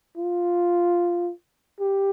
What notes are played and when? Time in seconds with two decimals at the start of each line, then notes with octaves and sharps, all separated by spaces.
0.17 F4
1.80 G4